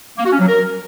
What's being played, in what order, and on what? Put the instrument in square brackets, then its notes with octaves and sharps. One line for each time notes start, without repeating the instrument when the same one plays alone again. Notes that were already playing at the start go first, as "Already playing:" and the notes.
[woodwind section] A#3
F#4
C#4
F#3
A#4